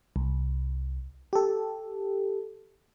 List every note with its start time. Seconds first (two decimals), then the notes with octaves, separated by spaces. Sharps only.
0.16 C2
1.33 G4 A4